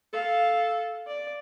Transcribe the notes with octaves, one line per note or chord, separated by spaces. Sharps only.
A4 F5
D5